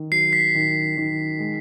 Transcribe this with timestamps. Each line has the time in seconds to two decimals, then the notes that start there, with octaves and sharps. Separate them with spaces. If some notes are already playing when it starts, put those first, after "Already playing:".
Already playing: D#3
0.11 F#3 C7
0.33 B6
0.54 D#3
0.97 D#3
1.39 G#3